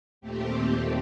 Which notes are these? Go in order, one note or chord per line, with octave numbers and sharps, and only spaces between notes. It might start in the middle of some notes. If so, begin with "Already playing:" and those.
D#2 A#2 A3 C4 G4